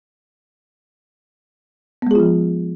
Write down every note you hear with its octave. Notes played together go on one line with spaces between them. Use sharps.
F3 G#3 B3 F4 G#4